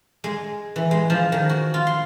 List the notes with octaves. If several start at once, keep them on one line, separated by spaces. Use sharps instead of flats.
G#3
E3
G#3
F3
D#3
F#4
F4
C6